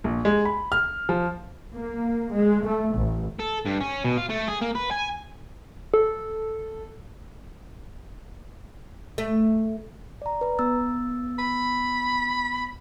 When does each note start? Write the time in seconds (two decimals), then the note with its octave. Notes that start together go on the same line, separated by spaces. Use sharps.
0.04 A#1
0.25 G#3
0.45 B5
0.72 F6
1.09 F3
1.74 A#3
2.34 G#3
2.65 A3
2.96 A1
3.40 A4
3.66 G2
3.81 C#4
4.04 B2
4.18 F4
4.30 A3
4.48 G#4
4.61 A#3
4.75 B4
4.91 G#5
5.94 A4
9.18 A3
10.22 D5 A#5
10.41 B4 A#5
10.58 B3 E6 A6
11.39 B5